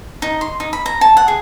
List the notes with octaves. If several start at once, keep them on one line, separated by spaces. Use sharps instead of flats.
D#4
C6
D#4
B5
A#5
A5
F#5
G#4